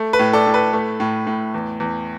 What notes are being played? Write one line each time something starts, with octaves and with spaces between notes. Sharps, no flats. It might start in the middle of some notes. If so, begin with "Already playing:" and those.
Already playing: A3
B4
A2
A4 D5
A2
B4
A3
A2
A2
E2
E2